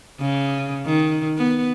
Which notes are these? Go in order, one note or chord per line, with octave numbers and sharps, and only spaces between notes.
C#3
D#3
B3